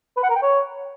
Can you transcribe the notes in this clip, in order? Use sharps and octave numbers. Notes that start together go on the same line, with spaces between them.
B4
F#5
A#4
G5
C#5